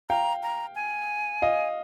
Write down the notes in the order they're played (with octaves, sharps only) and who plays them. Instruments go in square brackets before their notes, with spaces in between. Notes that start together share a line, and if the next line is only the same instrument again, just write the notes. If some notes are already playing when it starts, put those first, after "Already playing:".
[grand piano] F5 G5 [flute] A#5
[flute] A#5
G#5
[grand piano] D#5 F5